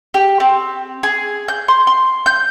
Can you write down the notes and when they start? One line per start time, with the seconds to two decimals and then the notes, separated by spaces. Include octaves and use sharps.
0.14 G4
0.40 C4
1.03 G#4
1.48 G6
1.68 C6
1.87 C6
2.26 G6